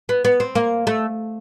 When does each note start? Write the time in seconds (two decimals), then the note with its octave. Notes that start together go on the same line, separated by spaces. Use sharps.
0.09 B3
0.25 B3
0.40 C4
0.55 A#3
0.87 A3